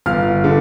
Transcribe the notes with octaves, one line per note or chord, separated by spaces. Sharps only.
G1 F5 F6
D3